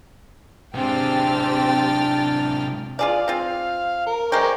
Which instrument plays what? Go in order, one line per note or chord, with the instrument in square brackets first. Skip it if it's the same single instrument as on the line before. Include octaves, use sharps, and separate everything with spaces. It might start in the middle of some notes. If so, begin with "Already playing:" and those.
[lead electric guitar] C3 G#3 [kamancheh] C4 G4 [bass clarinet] D4 [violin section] G5 F6 A6
[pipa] F4 G#4 D5 [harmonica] F5
[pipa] C4 F4
[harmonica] A#4
[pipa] G#3 A#4 G5 [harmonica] C5 C#6 D6